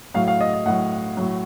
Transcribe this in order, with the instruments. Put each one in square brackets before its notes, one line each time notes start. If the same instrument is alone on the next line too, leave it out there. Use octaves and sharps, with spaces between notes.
[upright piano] A2 F#3 F5
F5
D#5
D#5
A2 F#3 F#5
A2 F#3